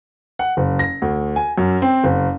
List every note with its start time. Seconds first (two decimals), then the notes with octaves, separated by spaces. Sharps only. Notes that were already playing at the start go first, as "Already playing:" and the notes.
0.39 F#5
0.57 F#1
0.79 A#6
1.02 D2
1.36 G#5
1.58 F#2
1.82 C4
2.04 F#1